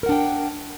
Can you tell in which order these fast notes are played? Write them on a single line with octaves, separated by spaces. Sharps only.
A#4 F#5 D4 G5